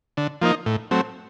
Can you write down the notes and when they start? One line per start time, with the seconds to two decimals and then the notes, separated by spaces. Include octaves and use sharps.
0.17 D3
0.41 F3 A#3 D#4
0.66 A2
0.91 F#3 A3 C4